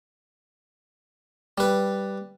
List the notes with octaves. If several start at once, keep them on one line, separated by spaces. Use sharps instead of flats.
G3 B4